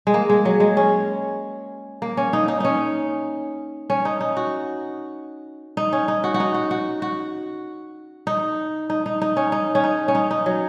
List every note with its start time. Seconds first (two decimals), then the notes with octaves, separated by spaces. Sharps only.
0.07 G#3
0.14 A#3
0.29 G#3
0.45 F#3
0.60 G#3
0.77 C#4
2.02 A#3
2.17 C#4
2.33 D#4
2.48 D#4
2.60 C#4 D#4
3.90 C#4
4.05 D#4
4.21 D#4
4.37 F#4
5.77 D#4
5.93 C#4
6.08 D#4
6.24 F#4
6.34 F#4
6.40 D#4
6.54 F#4
6.71 F#4
7.02 F#4
8.27 D#4
8.90 D#4
9.06 D#4
9.22 D#4
9.37 C#4
9.52 D#4
9.75 C#4
9.84 D#4
10.08 C#4
10.15 D#4
10.31 D#4
10.46 F#3